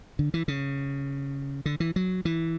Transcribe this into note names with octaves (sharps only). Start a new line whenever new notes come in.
D3
E3
C#3
D3
E3
F#3
E3